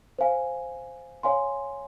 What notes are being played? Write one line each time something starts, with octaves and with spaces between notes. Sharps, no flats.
C5 F5 G#5
C#5 F5 G#5 C6